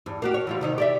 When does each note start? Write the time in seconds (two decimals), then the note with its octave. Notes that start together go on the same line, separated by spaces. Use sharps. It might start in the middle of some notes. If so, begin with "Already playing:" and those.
0.06 E2 G2
0.22 A#3 F#4 G4
0.34 C#5
0.47 E3 G3 F4
0.61 C3 D#3 D#4
0.78 G4 D5 E5